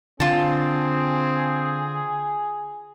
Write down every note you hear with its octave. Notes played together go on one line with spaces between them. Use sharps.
D3 C4 F4 G#4 A5